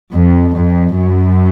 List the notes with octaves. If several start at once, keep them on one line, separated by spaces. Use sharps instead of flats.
F2
F2
F#2